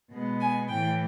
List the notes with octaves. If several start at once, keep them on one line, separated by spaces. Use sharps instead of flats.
B2 G#3 B3
G#5
A2 E3 A3 G5